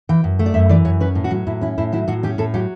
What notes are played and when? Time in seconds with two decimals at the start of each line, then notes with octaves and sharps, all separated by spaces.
0.09 E3 G5
0.24 F#2
0.39 A3
0.46 D5
0.54 F#2 E5
0.69 E3 D5
0.85 F#2 C#5
1.00 C#4 B4
1.15 A2
1.24 F#4
1.31 F#3
1.47 A2 E4
1.61 C#4 E4
1.78 A2 E4
1.92 F#3 E4
2.08 A2 F#4
2.23 C#4 G4
2.38 A2 A4
2.54 F#3 G4